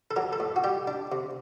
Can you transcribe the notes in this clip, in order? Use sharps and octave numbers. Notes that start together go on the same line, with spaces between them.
A4
F#3 A#4
A4
A2
F#4
G3 G4
D4
C3